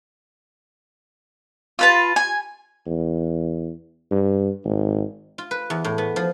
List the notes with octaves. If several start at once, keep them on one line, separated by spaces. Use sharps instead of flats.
F4 B4 A5
G#5
E2
G2
G#1
F4
B4
E2
A2
B3
F3